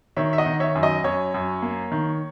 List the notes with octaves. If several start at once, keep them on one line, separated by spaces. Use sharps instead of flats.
D#3 C#5 E5
E5
D#5 F#5
D#3
C#5 E5
F#2
D#5
F#2 C#5
F#2
A#3
D#3